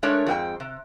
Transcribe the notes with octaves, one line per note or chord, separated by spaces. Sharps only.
G#3 A3 D4 A#4 C#5
F2 G#2 F#4 C5 G5
C3